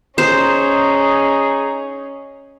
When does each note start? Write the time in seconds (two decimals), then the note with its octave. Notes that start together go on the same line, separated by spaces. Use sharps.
0.18 C#4 D#4 G#4 C5